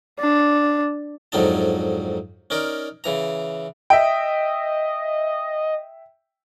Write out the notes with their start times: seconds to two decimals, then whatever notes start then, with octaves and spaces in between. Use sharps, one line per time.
0.20 D4
1.32 F2 G#2 D3 F#3 D#4 A5
2.50 C#4 D#4 A#4 D5
3.04 C#3 E3 A#5
3.90 D#5 E5 G5